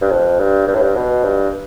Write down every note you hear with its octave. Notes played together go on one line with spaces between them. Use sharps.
G2
F2
G2
G2
A2
G2
B2
G2